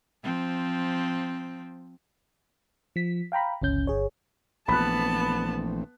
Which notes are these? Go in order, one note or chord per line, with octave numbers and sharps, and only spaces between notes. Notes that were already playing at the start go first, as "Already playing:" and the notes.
F3 C4
F3 B6
F5 G5 A#5 B5
G1 C#2 C#4 G6
G1 G#4 C#5
A#1 E3 A3 B3 C4 A5 B5 F#6